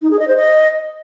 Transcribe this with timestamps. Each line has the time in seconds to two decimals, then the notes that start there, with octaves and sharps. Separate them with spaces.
0.01 D#4
0.10 G#4
0.19 D#5
0.27 C5
0.36 D#5